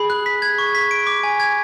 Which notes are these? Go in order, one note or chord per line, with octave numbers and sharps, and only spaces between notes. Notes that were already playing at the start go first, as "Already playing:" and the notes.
Already playing: G#4 B5
F#6
B6
G#6
C#6
B6
D7
D6
G#5
G#6